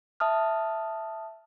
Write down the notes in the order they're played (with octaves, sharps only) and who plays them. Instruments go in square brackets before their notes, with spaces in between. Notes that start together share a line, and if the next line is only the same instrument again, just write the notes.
[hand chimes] E5 A5 D#6 F6